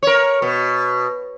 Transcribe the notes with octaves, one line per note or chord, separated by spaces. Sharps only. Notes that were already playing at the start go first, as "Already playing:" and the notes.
A#4 C#5
B2